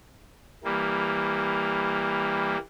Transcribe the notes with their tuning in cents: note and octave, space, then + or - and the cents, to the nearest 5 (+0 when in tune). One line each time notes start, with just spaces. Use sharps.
E3 +0 G3 +20 A#3 +0